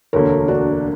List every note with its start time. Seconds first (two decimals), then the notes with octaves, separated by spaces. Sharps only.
0.13 E1 D2 D3 A#3 A#4 C#5
0.48 D4 F#4